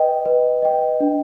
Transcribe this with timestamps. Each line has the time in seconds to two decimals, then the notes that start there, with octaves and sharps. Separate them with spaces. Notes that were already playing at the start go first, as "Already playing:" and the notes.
Already playing: B4 D#5 G5
0.26 B4
0.62 D#5 G5
1.00 D4